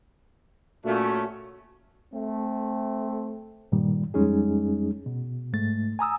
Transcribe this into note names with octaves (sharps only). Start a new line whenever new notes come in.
A#2 A3 C#4 F#4
A3 C4
G2 A#2 D#3 G3
F2 G3 G#3 C#4 D#4 G#4
B2
G#2 A3 A6
G#5 A#5 D#6 E6